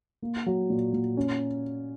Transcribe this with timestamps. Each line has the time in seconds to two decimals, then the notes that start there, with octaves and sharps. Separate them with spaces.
0.22 A#3
0.46 F#3
0.70 A#2
0.93 A#2
1.17 C#4